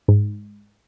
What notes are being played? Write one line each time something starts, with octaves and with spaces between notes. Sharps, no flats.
G#2